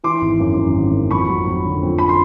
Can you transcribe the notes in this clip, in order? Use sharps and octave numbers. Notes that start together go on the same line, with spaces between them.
E3 C6 D6
G#1
F#2
F#2
G#1
F#2
F2 B5 C#6
F#3
F2
D3
F2
B5
C6